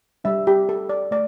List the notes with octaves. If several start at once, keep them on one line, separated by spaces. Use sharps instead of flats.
G3 D4 G4 E5
G4
A4
D5
A3 D5